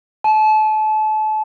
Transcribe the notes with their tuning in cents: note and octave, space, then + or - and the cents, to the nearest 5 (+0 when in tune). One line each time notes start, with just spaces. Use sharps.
A5 -30